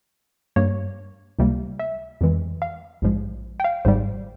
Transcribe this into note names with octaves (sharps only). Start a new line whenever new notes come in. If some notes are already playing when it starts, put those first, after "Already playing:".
G2 G3 A#3 C#5
C#2 C3 G3 A#3
E5
F2 E3 G#3
F5
A#1 G#2 F3 G#3
G5
F5
G#1 G#2 G3 C5